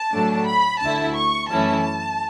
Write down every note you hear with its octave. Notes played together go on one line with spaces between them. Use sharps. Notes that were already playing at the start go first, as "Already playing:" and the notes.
Already playing: A5
A2 F#3 A3 D4
B5
D2 D3 A3 E4 A5
C#6
F#2 E3 A3 C#4 E4 A5